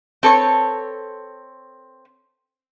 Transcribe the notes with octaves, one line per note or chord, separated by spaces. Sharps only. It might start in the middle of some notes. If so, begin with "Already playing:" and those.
C4 A4 B4 C#5